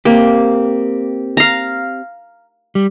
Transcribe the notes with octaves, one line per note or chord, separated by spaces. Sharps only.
A#3 C4 G4
F5 A#5
G3